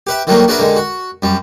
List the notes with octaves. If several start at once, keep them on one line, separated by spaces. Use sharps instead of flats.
G4 B4 E5
D#3 E3 F#3 G3 A3 A#3
D4 F#4 G#4 A#4 B4 E5
D3 D#3 G#3
F#4
F#2 G3